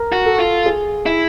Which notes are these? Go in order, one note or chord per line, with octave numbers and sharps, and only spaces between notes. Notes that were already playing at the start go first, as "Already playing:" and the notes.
Already playing: A#4
F#4
A4
F4
G#4
E4